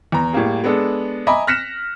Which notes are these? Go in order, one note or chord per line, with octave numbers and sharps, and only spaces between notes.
E2 A#5
A2 G3 A#3 G#4
G#3 B3 D4 A4
D#5 E5 G#5 A#5 B5 D6
F6 F#6 A#6 B6 C#7 E7